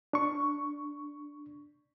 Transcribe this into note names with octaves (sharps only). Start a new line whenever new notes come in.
D4 C#6